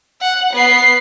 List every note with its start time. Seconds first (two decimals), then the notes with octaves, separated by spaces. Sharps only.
0.21 F#5
0.53 B3 C7